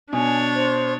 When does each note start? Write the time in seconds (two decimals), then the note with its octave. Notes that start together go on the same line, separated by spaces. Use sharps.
0.13 B2 D4 C#5 G#5
0.55 C5